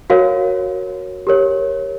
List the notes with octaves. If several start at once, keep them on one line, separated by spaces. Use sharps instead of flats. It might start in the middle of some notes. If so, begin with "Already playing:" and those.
F#4 A#4 C#5 F5
G4 A#4 C#5